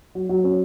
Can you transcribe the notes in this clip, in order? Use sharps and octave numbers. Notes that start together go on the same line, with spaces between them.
F#3
F#3
C#4